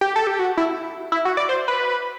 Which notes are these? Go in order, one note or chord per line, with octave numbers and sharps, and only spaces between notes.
G4
A4
G4
F#4
E4
E4
F#4
D5
C5
B4